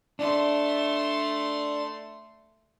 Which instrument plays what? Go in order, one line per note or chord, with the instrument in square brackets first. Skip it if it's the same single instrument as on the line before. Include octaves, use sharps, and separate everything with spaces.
[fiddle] A3 C6 [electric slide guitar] D4